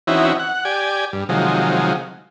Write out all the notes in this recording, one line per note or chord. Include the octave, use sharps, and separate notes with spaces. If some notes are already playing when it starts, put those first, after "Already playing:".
E3 C4 C#4 D#4 E4 F#4
F#5
G4 D5 G#5
G2
C3 D#3 F3 F#3 G#3